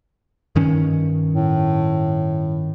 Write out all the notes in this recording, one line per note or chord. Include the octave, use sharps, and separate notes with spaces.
G2 D#3 C#4
A2